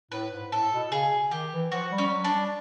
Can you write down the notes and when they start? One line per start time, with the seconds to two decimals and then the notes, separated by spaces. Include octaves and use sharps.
0.11 A2 B4
0.32 G#2
0.52 A2 A4
0.72 B2
0.92 C#3 G#4
1.31 D#3 G4
1.52 E3
1.71 F3 F#4
1.92 G3
1.98 C#4
2.07 G3
2.11 F#3
2.24 D4
2.31 G3